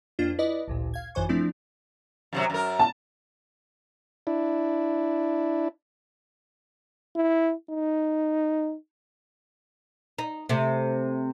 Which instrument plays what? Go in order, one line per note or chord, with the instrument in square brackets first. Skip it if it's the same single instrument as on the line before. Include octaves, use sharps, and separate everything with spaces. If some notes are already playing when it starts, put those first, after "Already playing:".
[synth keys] F2 A#3 D4 F4
E4 B4 D5 D#5
A1 D2 A#2
F5 G#6
G#1 F#2 E3 C5 G#5 C#6
F3 A3 C4 D4 E4
[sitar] F#2 C3 F#3
F#2 A#4
[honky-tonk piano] A5
[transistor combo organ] D4 E4
[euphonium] E4
D#4
[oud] D#4
C3 A3